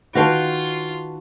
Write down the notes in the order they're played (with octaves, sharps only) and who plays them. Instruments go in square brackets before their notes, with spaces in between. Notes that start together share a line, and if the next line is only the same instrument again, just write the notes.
[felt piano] D#3 B4 A5 [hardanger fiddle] F4 [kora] F#4 F5 G5